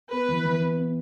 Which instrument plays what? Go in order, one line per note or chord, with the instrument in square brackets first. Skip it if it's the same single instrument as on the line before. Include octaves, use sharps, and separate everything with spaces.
[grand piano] B3 [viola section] B4
[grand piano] E3
E3
B3
B3